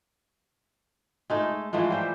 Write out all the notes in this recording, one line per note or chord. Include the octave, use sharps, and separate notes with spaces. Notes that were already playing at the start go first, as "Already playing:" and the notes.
G#3 A3 D#4
E3 F3 G#3 A3
G3 C5 E5